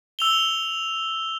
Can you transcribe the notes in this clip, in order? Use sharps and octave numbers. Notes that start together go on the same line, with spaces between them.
E6 F7 G7